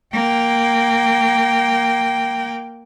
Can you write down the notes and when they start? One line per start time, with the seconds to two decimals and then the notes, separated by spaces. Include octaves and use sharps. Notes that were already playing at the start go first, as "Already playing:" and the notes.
0.14 A#3 G5